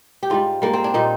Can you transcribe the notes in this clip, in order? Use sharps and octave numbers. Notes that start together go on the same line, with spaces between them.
G4
G#2 G3 F4
G#2 G3 A#3
C4
D4
A#2 G3 D#4